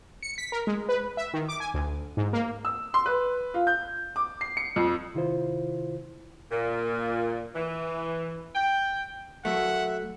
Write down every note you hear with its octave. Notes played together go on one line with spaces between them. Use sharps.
C#7
B6
A#4
G#3
B4
E5
D#3
D6
G#5
D2
G#2
A#3
E6
C6
B4
F4
G6
D6
C7
C#7
F2
C3 D#3 E4 F4 C5
A#2
E3
G5
F#3 A3 E5 F#5